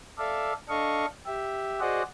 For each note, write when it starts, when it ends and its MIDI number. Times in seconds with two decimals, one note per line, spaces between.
0.18 0.53 69
0.18 0.53 74
0.18 0.53 76
0.18 0.53 77
0.69 1.05 62
0.69 1.05 69
0.69 1.05 75
0.69 1.05 77
0.69 1.05 85
1.26 1.80 67
1.26 1.80 76
1.80 2.02 66
1.80 2.02 68
1.80 2.02 72
1.80 2.02 74
1.80 2.02 75
1.80 2.02 78